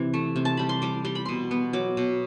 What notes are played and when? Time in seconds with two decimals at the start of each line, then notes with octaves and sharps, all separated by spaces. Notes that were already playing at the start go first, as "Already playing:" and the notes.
Already playing: C3 E3
0.14 A3
0.36 C3
0.45 A5
0.57 G3 B5
0.69 C6
0.82 G3 D6
1.05 G3 C6
1.15 B5
1.25 B2 C6
1.51 B3
1.73 F#3 D6
1.97 B2